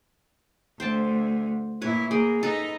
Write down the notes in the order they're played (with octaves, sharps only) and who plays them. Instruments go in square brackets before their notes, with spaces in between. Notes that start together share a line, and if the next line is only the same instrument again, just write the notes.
[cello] D2 [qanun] C5 G5 A5
[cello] A#2 E4 [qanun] B4 C#5
[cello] A#3 [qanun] G#4 G5
[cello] D#4 [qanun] A4 B4